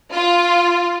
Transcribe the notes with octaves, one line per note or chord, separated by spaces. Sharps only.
F4